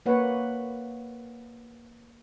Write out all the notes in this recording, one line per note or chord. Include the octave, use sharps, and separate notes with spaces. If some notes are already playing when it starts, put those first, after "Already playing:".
A#3 B4 C#5 F#5